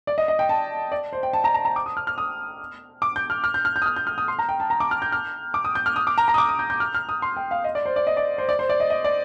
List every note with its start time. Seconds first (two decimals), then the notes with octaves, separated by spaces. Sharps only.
0.07 D5
0.18 D#5
0.28 D#5
0.39 G5
0.49 A5
0.92 D5
1.13 C5
1.23 G5
1.33 A5
1.44 A#5
1.54 A#5
1.65 A#5
1.76 D6
1.86 D#6
1.97 F6
2.07 F6
2.18 D#6
3.02 D6
3.16 G6
3.30 F6
3.44 F6
3.54 G6
3.65 F6
3.76 G6
3.82 D#6
3.86 F6
3.96 G6
4.07 F6
4.18 D#6
4.28 C6
4.39 A#5
4.49 G5
4.60 A5
4.70 A#5
4.80 D6
4.91 F6
5.02 G6
5.12 F6
5.54 D6
5.65 D#6
5.75 G6
5.86 F6
5.96 D#6
6.07 D6
6.18 A#5
6.28 A#5
6.34 D#6
6.38 D6
6.49 D#6
6.59 G6
6.70 G6
6.80 F6
6.95 F6
7.09 D#6
7.22 C6
7.37 G5
7.51 F5
7.64 D#5
7.75 D5
7.85 C5
7.96 D5
8.07 D#5
8.17 D5
8.38 C5
8.49 D5
8.59 C5
8.69 D5
8.80 D#5
8.90 D#5
9.04 D5